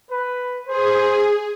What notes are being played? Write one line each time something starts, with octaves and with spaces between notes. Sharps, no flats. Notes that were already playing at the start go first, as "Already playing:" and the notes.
B4
G#4 C5